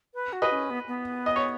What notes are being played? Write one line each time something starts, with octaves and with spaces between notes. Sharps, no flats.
B4
F#4
B4 D#5
C#4
B3
B3
D#5
C#5